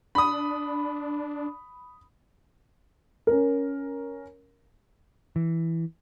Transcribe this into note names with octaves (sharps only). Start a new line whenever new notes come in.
D4 B5 D#6
C#4 A#4
E3